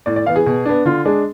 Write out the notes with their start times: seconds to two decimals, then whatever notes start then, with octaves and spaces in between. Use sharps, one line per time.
0.06 A2 D5
0.16 D5
0.26 E3 B3 F5
0.36 G#4
0.46 B2
0.66 B3 D4
0.85 D3 F4
1.05 G#3 D4 G#4